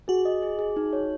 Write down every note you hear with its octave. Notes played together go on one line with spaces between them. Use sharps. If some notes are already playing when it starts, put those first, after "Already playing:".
F#4 G#4
D#5
G#4
G#4
D#4
C#5